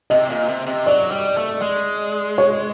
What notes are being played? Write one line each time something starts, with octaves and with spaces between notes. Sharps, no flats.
C3 D#5
A#2
C3
C3
F#3 D5
G3
A3
G#3
C#5